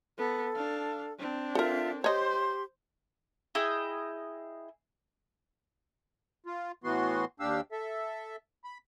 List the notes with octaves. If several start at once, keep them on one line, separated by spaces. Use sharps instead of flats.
B3 A4
D4 F5
C4 D4
F4 A4 A#4 E5
G4 C5 C#5 D#5 C6
E4 G#4 D#5 G5
F4
A2 E3 B3 F#4 C6
D#2 D4 G4 F5 E6
A4 E5
B5